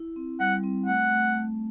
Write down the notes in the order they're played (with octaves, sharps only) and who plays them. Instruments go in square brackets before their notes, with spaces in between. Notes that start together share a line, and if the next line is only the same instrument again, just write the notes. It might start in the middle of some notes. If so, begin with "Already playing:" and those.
Already playing: [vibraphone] E4
C4
[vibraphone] G3 [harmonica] F#5
[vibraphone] C4
[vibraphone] A3 [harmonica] F#5
[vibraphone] A3
A3